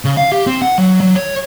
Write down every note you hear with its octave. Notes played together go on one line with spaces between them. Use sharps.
C#3
F5
G4
C4
F#5
F#3
F#3
C#5